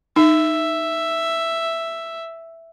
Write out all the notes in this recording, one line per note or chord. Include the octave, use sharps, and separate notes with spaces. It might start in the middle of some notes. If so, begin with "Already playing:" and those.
D#4 E5